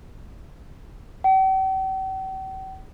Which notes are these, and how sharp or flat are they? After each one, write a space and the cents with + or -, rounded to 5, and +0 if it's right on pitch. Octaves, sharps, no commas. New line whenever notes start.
G5 -45